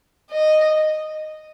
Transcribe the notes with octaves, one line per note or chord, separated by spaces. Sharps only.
D#5